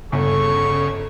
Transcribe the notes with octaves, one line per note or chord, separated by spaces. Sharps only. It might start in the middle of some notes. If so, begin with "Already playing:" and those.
G1 C#3 A4 C#5 C#6